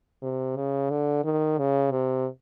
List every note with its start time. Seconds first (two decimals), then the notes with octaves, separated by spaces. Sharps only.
0.22 C3
0.57 C#3
0.90 D3
1.24 D#3
1.58 C#3
1.91 C3